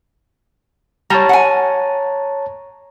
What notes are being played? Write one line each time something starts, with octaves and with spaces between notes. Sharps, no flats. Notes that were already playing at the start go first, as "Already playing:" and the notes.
G3 C#5 A5 A#5
F#5 G#5